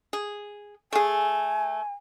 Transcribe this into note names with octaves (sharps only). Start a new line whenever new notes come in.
G#4
A3 G#4 G#5